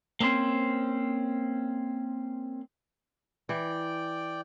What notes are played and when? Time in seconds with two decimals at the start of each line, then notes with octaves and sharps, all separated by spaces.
0.20 A#3 C4 C#4 C5
3.49 E3 D5 G5